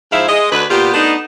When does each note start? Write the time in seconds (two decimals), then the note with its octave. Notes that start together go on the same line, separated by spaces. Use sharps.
0.12 G#2 F3 E4 E5 F5
0.29 G#3 D#5
0.52 D2 D3 B4
0.71 A#2 B3 F4 G4
0.94 A3 B3 D4 D#4